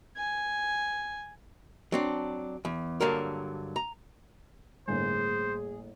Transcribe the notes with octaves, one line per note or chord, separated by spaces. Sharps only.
G#5
F#3 C4 D4
E2
G2 D3 F#3 A#3 A#4
A#5
G1 A2 A#3 G#4 C5